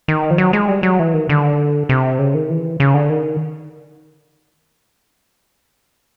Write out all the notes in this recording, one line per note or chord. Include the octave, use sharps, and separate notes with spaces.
D#3
F3
F#3
G#3
G3
F#3
E3
D#3
D3
C3
C#3
D#3
E3
C#3
D3
D#3